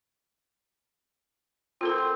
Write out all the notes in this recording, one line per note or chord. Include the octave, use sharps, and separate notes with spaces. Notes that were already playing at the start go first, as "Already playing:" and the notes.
C4 F4 A4 A#4